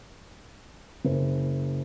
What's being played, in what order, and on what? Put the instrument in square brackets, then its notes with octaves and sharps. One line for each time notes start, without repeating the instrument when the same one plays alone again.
[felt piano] F#1 C5